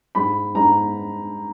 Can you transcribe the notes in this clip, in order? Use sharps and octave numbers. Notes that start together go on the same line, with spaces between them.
G#2 B5
G#2 A#5